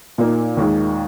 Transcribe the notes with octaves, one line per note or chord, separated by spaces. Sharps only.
A#2 A#3 D#4
D#2 D#3 G#3